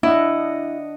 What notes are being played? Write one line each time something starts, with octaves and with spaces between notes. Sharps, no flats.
D4 E4 D#5 F#5